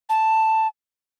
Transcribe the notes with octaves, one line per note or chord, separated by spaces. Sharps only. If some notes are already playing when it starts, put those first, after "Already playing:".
A5